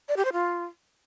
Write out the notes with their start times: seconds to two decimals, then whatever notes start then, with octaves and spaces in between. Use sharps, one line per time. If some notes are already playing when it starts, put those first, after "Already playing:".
0.09 D5
0.17 G4
0.25 C5
0.33 F4